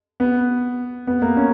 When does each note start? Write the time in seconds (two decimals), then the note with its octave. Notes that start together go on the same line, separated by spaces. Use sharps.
0.20 B3
1.07 B3
1.22 A#3
1.37 C#4